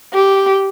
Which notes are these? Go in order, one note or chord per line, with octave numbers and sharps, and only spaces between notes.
G4